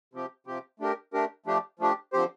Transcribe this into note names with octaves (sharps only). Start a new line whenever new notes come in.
C3 F3 C4 G4
C3 F3 C4 G4
A3 D4 G4 A#4
A3 D4 G4 A#4
F3 A3 D4 G4
F3 A3 D4 G4
D3 F3 C4 G4 C5